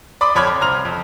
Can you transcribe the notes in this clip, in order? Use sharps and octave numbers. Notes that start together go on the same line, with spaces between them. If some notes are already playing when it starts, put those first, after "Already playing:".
D5 B5 C6 D6 D#6
F2 C#5 B5 F6 G#6
C6
C2 C4 A#5 F6 F7
F2